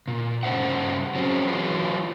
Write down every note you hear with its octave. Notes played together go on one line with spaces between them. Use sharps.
A#2
G2 C#3 C5 E5 F#5
F#3 C4 C#4 G#4
E3 F#3 F4 B4